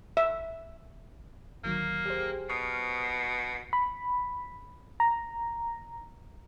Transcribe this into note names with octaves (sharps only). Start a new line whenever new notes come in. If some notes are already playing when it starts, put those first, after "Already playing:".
E5
D2 D#3 F#3 A#3
G4 G#4 C5
B2 C#6 D#6 F6
B5
A#5